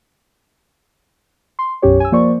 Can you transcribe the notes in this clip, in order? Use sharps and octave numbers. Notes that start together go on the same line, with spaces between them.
C6
B1 F#2 C#4 G4 C#5
G#5 E6
F3 A#3 C5 D5 C#6